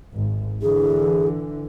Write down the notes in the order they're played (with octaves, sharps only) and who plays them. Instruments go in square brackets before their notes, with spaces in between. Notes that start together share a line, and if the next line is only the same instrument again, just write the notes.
[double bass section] G#1
[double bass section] D3 E3 [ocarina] G#4